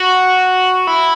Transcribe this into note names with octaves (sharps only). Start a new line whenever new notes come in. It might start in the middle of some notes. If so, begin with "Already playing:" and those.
Already playing: F#4
E4